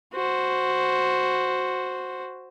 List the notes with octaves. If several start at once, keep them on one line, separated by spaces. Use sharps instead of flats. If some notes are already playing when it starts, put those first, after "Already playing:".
F#4 C5